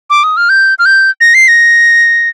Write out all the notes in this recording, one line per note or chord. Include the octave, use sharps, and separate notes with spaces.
D6
D#6
F6
G6
F6
G6
A#6
C7
A#6